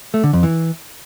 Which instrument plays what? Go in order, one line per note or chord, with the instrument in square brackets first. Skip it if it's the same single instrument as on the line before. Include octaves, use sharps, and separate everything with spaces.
[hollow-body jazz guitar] A3
D3
F2
E3